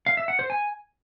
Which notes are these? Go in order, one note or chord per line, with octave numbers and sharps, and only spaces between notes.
F5
E5
F#5
C5
G#5